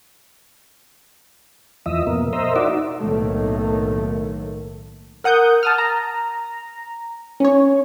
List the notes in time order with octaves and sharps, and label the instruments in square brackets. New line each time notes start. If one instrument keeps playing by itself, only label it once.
[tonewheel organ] E2 F3 D#5 E5
F2 B2 A#3
A#4 C5 D#5 E5
D#4 F#4 D5 E5
[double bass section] B1 A2 D#3 F#3 A3 A#3
[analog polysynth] A#4 F#5 D#6 G6
A5 D#6 F6
A#5
C#4 C#5